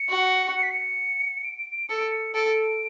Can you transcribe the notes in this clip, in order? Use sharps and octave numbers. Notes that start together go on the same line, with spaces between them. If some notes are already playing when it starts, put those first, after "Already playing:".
Already playing: C#7
F#4
C#7
B6
C#7
D7
D7
D7
A4 C#7
D7
C#7
A4 D7